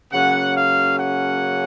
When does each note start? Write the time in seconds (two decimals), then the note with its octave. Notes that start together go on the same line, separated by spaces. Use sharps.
0.12 C#3 F#3 A#3 C#4 F#5
0.56 F5
0.99 F#5